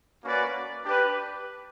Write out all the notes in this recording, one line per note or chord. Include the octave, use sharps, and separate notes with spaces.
A#3 C#4 F#4 B4 D5
D4 G4 B4